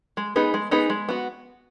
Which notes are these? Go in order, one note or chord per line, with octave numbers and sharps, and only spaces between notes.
G#3
B3 D#4 G#4 B4
G#3
B3 D#4 G#4 B4
G#3
B3 F#4